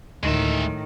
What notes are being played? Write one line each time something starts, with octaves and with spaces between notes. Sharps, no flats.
D2 A2 D#3 G#3 E5